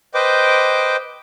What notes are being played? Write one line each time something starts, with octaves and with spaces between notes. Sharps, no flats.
B4 C5 D#5 G5 D6